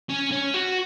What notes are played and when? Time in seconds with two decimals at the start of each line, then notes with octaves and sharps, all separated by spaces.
0.09 C#4
0.31 C#4
0.54 F#4